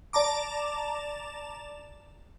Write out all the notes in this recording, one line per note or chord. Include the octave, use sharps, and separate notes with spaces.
D5 A5 A#5 D6